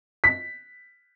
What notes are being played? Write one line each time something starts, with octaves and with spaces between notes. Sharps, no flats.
B6